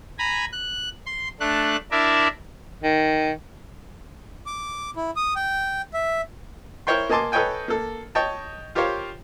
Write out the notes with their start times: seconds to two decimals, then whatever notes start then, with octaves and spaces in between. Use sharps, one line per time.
0.19 G#5 A#5 B5
0.52 F#6
1.06 C6
1.40 A3 D4 F#6
1.91 D4 E4 A#4 D5 E5
2.83 D#3
4.46 D6
4.96 E4
5.16 D#6
5.36 G5
5.94 E5
6.87 E4 A#4 C5 C#5 G5 C6
7.09 A#3 D#5 G#5 A5 C6 D6
7.32 A4 B4 C#5 D#5 G5 G#5
7.68 A#3 A4
8.15 C#5 D#5 G5 A5
8.75 F4 G4 A#4 C5 C#5 F5